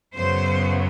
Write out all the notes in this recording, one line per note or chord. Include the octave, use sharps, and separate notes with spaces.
F#2 C#3 F#3 B3 C5